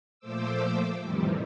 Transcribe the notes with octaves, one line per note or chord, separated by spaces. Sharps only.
A#2 F3 A3 C5 D6 E6
F2 A2 C3 D#3 E3 G3